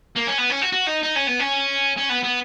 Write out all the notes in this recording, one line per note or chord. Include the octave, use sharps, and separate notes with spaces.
A#3
C#4
B3
C#4
F#4
F#4
D#4
D#4
C#4
B3
C#4
C#4
B3
B3